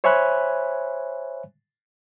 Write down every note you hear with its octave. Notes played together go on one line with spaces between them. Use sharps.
C5 C#5 E5 G#5 B5 F#6